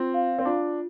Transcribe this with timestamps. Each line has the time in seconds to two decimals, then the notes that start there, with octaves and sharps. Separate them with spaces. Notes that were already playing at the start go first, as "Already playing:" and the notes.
Already playing: C4 F4
0.14 F5
0.38 C4
0.45 D4 F4